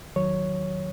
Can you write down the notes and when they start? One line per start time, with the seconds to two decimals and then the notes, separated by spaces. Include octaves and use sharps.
0.16 E2 D#3 F#3 C#5